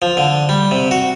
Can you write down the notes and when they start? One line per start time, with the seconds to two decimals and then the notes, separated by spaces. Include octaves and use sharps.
0.02 F3
0.17 D3
0.49 G3
0.71 C3
0.91 F#4